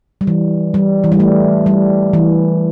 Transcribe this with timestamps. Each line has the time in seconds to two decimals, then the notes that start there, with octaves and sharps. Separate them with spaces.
0.21 G3
0.27 E3
0.74 G3
1.04 E3
1.12 G3
1.20 A3
1.66 G3
2.13 E3